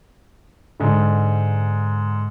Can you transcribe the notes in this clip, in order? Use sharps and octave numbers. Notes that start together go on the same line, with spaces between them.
G#2 D3